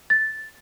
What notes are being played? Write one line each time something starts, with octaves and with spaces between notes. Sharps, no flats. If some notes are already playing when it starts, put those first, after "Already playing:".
A6